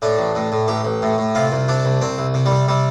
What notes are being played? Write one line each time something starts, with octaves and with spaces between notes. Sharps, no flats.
A2 D4
A1
A2
A2
A1 G4
A1
A2
A2
C3 F4
C2
C3 D4
C2
C2 C4
C2
C3
G3
C3
C3 G3